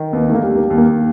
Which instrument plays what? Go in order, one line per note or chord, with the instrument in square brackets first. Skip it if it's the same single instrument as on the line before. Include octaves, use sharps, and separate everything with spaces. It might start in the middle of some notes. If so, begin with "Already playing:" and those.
Already playing: [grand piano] D#3
[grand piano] D#2 [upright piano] B3
[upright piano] A3
A#3
[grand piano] G3
[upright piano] A#3
[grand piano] D#2
[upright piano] A#3